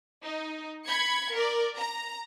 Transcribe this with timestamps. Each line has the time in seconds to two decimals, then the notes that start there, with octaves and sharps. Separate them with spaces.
0.25 D#4
0.86 B5 G#6 C#7
1.34 A#4 D5
1.76 A#5